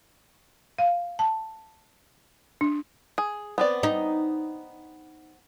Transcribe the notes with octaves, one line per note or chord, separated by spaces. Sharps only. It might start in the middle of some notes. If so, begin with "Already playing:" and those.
F5
A5
D4
G#4
B3 C4 D5
D#4